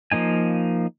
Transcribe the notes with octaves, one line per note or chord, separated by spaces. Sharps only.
F3 A#3 D#4 G#5